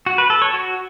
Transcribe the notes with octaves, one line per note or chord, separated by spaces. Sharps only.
F#4
B4
A4
C#5
F#4